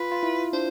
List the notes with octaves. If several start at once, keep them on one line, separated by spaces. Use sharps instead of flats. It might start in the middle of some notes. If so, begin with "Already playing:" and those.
Already playing: F4 B4
F4
E4
D4 C5